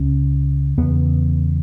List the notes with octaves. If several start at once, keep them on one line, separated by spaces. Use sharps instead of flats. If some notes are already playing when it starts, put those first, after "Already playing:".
Already playing: C#2 C#3 C#4
E2 B3
C#3